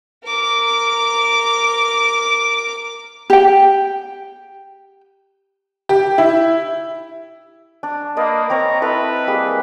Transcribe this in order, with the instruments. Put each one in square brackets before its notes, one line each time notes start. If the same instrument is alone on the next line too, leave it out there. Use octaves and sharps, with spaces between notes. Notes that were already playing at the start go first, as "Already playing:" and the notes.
[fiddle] A#4 D6
[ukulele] G4 G5
[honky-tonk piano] G4
E4
[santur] D4
[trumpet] A#3 [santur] B4 D5 D#5
[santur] C4 B4 C#5 [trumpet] A#5
[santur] E4 A4 D#5 [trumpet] B4
[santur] G3 A#3 G#4